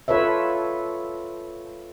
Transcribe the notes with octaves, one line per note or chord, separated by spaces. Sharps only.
F4 A4 B4 C#5 E5